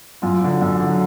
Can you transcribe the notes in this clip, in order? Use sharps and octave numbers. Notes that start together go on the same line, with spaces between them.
F#2 F4
D3 F#3
F#2
D3 F#3